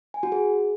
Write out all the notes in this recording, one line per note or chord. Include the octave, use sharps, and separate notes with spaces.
G#5
F#4
G#4